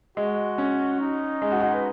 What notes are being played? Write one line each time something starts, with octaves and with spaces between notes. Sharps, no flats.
G#3 F#4
C#4
D#4
G#3
F#4
F#4
B4